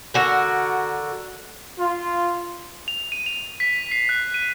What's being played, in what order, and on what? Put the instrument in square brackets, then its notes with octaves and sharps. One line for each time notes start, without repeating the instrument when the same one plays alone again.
[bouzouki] D3 F#4 A#4
[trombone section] F4
[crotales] F7
D#7
F7
B6
C7
F#6
D#7